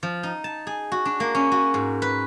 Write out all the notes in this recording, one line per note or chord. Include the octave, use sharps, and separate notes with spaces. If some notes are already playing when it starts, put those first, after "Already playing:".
F3
D#4
A5
G#4
F#4
D4
A#3
C#4
F#4
G#2
B4